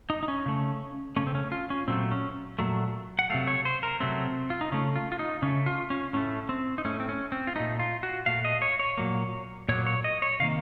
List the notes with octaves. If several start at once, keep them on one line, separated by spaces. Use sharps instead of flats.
D#4
D#4
C#4
C#3 A3
C#3 A3 C#4
C4
C#4
F4
C#4
A#2 F#3 A3 C4
C#4
A#2 F#3 A3
F#5
C3 F#3 A3 F5
C#5
C5
A#4
C3 F#3 A3 C4
F4
D#4
C#3 A3 C#4
F4
F4
D#4
C#3 A3 C#4
F4
C#4
A2 A3 C#4
C4
D#4
A2 A3 C#4
C4
C#4
C4
F4
A#2 A3 D#4
F4
F#4
A#2 A3 F5
D#5
C#5
C#5
A#2 F#3 A#3
A#2 F#3 A#3 C#5
C#5
D#5
C#5
C3 D#3 A#3 F5